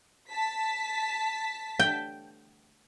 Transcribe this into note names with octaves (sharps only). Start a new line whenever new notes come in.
A5 B6
G5